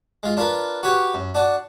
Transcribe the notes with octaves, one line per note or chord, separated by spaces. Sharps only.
G#3 F4
D4 F4 A#4 B4
F#4 G4 B4 C#5
F#2
D4 F#4 D5